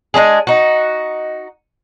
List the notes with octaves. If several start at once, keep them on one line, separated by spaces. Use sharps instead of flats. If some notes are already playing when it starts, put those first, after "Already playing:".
G#3 A3 D4 G#4
D#4 F#4